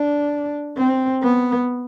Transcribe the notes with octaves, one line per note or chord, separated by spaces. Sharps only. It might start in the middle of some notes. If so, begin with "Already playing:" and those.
Already playing: D4
C4
B3